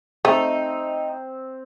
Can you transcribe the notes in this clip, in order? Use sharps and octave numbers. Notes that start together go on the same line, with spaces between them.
A3 C4 D#4